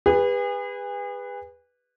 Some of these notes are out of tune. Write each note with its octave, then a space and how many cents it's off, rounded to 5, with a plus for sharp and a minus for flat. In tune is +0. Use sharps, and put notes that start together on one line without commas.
G#4 -40 B4 +0